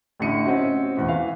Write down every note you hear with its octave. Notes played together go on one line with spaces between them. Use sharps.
A1 A2 D3 C#7 D#7
C4 C#4 F#4 D#5
E2 A2
E3 F5